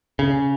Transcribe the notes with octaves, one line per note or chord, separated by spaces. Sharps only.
C#3